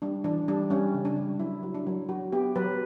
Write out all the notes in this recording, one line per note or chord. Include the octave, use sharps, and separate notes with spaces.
G3 D4
E3 D4
G3 D4
G3 C#4
C#3
D4
G3
F#3 E4
F#3
D4
F#3
F#3 F#4
B3 G4
F#3 B4